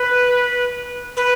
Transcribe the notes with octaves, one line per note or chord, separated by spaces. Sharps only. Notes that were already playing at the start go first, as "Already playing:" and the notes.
Already playing: B4
B4